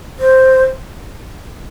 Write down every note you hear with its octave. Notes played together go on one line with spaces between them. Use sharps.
C5